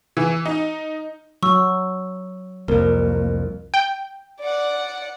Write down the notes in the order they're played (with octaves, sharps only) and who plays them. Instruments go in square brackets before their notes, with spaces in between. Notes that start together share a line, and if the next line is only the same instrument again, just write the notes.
[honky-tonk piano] E3
D#4
[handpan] F#3 [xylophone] C#6 E6
[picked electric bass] C2 F2 [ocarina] A#3 [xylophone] A#4
[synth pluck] G5
[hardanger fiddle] D5 F#5